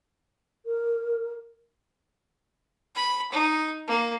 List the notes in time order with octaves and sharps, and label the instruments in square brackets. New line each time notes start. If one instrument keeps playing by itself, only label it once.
[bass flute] A#4
[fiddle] B5
D#4
A#3